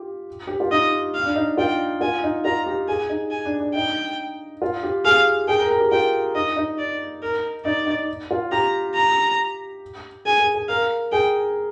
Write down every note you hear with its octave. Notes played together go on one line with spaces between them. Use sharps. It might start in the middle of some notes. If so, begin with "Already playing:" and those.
Already playing: F4 G4
G4
F4
D#4 D#5
F5
D4
D#4
F4 G5
F4 G#5
D#4
F4 A#5
G4
G#4 G#5
D#4
G#5
D4
D4
D#4 G5
F4
G4
G#4 F5
G#4 G5
A#4
A#4
G4
F4 G5
D#4 D#5
D#4
D5
A#4
D#4 D5
D#4
F4
G4 A#5
A#5
G#4 G#5
G#4
G#4
A#4 F5
G#4 G5